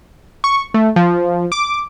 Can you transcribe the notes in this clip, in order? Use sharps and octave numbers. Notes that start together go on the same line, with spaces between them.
C#6
A3
F3
D6